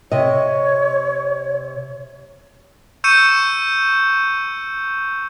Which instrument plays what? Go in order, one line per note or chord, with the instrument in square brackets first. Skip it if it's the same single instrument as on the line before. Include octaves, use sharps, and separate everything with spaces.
[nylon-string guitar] C3 D#5 [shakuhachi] C#5
[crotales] C#6 E6 G6 C#7 D#7 E7